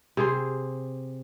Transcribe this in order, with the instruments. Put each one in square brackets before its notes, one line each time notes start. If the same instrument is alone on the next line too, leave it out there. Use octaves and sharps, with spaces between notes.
[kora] C3 G#4 C5